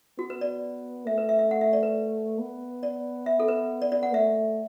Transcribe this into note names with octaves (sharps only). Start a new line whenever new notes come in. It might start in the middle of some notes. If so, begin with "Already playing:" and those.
B3 F#4
B4
D5
A3 E5
B4
E5
E5
F#5
E5
D5
B4
B3
D5
E5
A4
B4
D5
D5
F#5
A3 E5